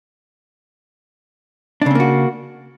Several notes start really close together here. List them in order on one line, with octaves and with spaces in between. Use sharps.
D4 C#3 C4 A#3 F#4